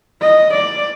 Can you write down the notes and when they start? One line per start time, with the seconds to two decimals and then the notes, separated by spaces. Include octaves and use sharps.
0.22 D#5
0.53 D5